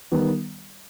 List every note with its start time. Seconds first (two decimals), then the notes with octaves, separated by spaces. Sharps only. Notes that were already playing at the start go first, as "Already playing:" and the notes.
0.12 D#3 G3 B3